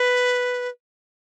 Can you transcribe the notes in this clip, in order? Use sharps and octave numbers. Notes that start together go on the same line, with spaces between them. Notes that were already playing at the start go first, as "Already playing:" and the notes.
Already playing: B4